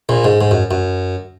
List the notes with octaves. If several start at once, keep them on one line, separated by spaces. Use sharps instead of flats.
A#1 A#2
G#2
G#2
F#2
F#2